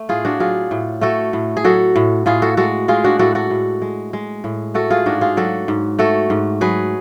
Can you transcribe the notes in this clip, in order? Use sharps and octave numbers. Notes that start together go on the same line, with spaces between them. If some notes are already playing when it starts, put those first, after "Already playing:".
Already playing: A3
A2 F4 G#4
D4 F#4
F#3 F4 G#4
A2
A3 F#4 A4
A2
G#4
F#3 F#4 A4
A2
A2 F4 G#4
F#4 A4
G#3 F#4 A4
G#3 F4 G#4
D4 F#4
A2 F#4 A4
F#4 A4
A2
G#3
G#3
A2
A3 F#4 A4
F4 G#4
G#2 D4 F#4
F4 G#4
F#3 F#4 A4
G#2
A3 F#4 A4
G#2
F#3 G#4 B4